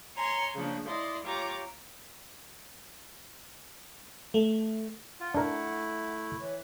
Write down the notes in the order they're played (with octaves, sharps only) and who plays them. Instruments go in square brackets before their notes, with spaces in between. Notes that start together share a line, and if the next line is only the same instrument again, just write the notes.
[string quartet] C#5 G#5 A#5 C6
C#3 F3 A#3 D4
E4 D5 D#5 C6
F4 G4 C#5 A#5 D6
[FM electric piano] A3
[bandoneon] F4 [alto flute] F#5
[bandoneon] A3 E4 [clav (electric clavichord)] D4 A#4
[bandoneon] E3 [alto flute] C#5